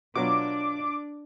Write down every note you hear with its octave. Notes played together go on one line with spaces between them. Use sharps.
B2 F#3 D4 F4 D6